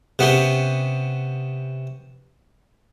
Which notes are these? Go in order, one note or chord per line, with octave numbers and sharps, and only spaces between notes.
C3 B3 C#4 G4